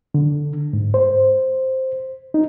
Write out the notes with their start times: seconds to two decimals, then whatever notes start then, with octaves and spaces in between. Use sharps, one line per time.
0.14 D3
0.73 G#2
0.94 C5
2.34 D#4